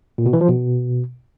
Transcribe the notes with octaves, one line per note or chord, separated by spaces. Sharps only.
A#2
B2
E3
F3
B2